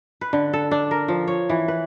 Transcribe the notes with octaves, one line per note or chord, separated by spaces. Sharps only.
B4
D3
A4
D4
A#4
F3
C#5
E3
B4